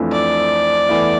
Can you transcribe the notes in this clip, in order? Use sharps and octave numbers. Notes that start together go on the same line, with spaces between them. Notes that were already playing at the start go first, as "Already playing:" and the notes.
Already playing: F2 E3 A3 D4 F4
D5
E2 E3 A3 E4